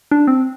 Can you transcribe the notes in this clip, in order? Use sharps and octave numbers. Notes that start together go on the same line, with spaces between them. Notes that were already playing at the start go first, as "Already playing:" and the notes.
D4
C4